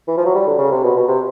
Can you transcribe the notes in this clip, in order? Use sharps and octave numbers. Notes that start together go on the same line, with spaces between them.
E3
F3
F#3
G3
D3
C#3
C3
B2
B2
C3